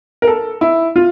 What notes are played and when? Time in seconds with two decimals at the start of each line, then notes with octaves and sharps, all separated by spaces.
0.22 A#4
0.27 A4
0.61 E4
0.96 F4